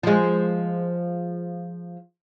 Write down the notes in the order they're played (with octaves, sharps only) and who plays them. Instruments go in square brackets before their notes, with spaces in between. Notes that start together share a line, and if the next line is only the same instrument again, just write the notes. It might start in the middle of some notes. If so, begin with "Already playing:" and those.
[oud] F3 G#3